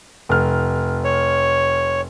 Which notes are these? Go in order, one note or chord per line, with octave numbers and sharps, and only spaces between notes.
F1 F6
C#5